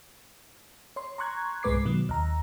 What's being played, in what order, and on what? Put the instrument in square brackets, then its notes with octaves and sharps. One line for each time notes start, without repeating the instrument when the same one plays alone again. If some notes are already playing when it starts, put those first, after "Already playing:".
[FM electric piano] C#5 C6
A#5 C6 C#6 F#6 G#6
C2 G#2 G#3 B4 D6 C7
B2 D#3 F#3
D#2 A#5